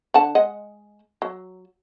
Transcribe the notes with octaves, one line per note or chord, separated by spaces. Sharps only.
D3 F#5 A5
G#3 D#5 F#5
F#3